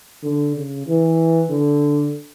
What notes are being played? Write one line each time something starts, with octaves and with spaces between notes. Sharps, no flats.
D3
C#3
E3
D3